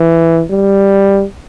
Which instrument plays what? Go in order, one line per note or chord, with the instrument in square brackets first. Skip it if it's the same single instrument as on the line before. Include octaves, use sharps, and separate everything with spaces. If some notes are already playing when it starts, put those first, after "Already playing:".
Already playing: [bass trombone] E3
G3